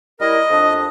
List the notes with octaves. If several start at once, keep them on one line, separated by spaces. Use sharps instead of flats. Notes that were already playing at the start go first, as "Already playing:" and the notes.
G3 E4 A#4 D#5
F2 D4 D#6